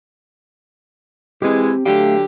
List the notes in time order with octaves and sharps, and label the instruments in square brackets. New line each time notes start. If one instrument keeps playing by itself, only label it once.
[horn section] E3 G#3 [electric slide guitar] C4 G4
[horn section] D3 F#3 G4 [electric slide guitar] A3 F5